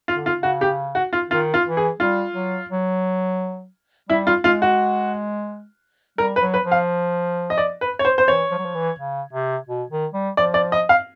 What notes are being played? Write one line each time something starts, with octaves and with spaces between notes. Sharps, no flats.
F4
D3
F4
C#3
F#4
G4
F#4
F4
D#3 F4
F4
E3
G#4
G3 F4
F#3
F#3
G3 E4
F4
G#3 F4
F#4
G3 A#4
B4
F#3
B4
F3
F5
D#5
D5
B4
C#5
C5
C5
E3 C#5
F3
F#3
F3
E3
C#3
C3
B2
D#3
G3
F3 D5
D5
D#5
F5